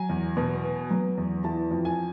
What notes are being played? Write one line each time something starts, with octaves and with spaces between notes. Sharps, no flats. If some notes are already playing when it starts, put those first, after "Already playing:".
Already playing: F#3 G#5
E2
B2
B3
F#3
E2
E3 A5
F2
G#5